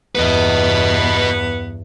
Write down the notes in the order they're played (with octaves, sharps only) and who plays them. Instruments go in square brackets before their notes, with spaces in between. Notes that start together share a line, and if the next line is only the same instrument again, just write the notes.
[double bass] E2 G2 [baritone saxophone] B3 [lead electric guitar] B4 D#5